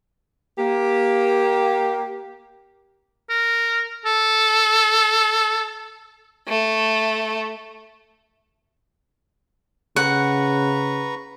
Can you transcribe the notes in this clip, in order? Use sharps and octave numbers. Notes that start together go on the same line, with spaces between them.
A#3 G4
A#4
A4
A3
C#3 B4 F#5 A#5 C#6